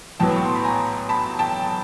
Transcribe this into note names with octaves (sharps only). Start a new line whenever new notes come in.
B1 A2 F#3 B3 G5 A5
C#6
C6
B5
G#5 A#5
A5 B5
G5 A5